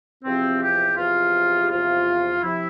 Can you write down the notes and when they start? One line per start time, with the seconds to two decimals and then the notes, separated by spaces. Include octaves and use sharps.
0.24 E2 C3 F3 C4
0.61 G4
0.97 E2 C3 F3 F4
1.59 G4
1.70 E2 C3 F3 F4
2.42 C3 F3 E4